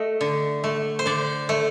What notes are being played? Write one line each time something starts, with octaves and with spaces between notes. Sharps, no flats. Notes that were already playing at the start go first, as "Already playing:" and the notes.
Already playing: A3 D#5
D3
A3
C5
D3 D5
A3